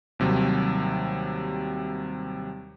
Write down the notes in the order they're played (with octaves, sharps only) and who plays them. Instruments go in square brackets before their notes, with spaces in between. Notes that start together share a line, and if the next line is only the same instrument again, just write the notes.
[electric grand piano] D#2 C3 F#3 G3